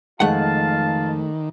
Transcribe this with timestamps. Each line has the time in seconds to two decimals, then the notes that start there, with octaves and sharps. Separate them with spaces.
0.20 F2 D#3 G#3 A3 F4 F5 F#5 A5